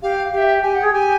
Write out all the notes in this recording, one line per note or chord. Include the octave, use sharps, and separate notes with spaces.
G4 F5
G4 F5
E5
G4 G#5
F#5
G#4 G5
G4 G#5